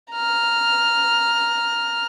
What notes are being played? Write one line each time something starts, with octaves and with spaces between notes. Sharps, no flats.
A#5 F6